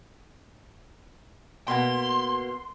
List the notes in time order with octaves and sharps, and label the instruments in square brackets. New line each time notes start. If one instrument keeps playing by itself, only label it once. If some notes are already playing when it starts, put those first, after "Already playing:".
[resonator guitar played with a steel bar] B2 A#3 B3 [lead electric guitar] C6